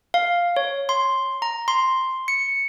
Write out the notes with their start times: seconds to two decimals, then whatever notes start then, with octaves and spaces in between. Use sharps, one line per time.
0.14 F5
0.57 C#5
0.89 C6
1.42 A#5
1.68 C6
2.28 C#7